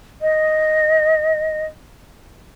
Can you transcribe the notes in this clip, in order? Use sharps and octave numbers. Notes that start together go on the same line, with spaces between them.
D#5